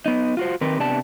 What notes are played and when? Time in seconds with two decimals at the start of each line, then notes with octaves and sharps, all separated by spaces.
0.06 B3 D#4
0.37 F4 F#4 C5
0.61 D#3 C4 G4 A#4 B4
0.80 C3 B3 D4 G4 A5